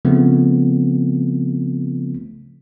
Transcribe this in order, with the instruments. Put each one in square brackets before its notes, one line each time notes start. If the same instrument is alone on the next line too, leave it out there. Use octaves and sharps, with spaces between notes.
[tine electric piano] C#3 F3 A3 B3 C4